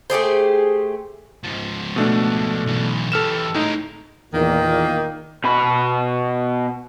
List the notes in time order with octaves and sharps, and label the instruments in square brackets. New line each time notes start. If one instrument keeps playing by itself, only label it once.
[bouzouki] A3 G4 G#4 C5
[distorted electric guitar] G#2 F3
[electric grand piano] B2 A3 D4
[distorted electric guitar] B1 E3
[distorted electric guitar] E3 G4 [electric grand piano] A4 F6 E7
[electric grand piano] A2 D#4 [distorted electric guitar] G#3 A#4
[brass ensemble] E2 A#2 [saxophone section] D#3 A#3
[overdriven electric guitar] B2 B5